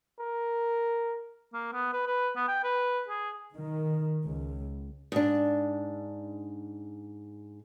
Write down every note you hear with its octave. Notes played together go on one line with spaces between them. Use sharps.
A#4
A#3
B3
B4
B4
B3
G5
B4
G#4
D#3
C#2
G#2 D4